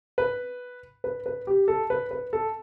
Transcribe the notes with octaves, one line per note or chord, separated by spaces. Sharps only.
B4
B4
B4
G4
A4
B4
B4
A4